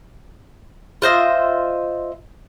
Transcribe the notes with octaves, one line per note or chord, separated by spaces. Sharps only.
F4 C5 D#5 E5